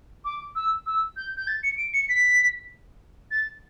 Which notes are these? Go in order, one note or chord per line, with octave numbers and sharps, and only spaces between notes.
D6
E6
E6
G6
G6
A6
C#7
D7
C#7
B6
A6